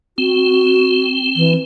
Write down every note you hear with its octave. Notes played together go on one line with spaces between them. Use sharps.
C4 F#4
E3